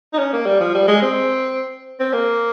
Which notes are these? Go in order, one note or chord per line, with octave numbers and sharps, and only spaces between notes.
D#4
C#4
A#3
G3
F3
G3
G#3
C4
C4
A#3